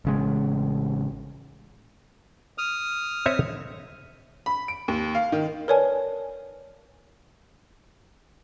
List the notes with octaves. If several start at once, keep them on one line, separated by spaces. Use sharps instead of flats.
A1 C#3 G#3
D#6 F6
C4 C#5 E5
B5
D7
D#2
F5
D#3
A#4 B4 C#5 D5 G#5 A5